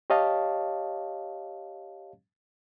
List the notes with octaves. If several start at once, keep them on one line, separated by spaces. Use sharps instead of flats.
G4 C#5 D#5 F5 A5